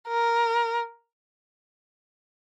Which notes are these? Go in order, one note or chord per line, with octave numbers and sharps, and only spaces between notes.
A#4